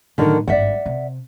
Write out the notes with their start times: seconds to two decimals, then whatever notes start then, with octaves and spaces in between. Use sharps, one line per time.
0.18 A2 D3 D#3 F#3 A#4
0.48 G#1 G2 D5 E5 F#5
0.86 C3